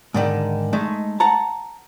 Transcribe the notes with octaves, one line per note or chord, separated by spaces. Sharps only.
G#2 D3 D#3
G#3 A3 D#4
F#5 A5 A#5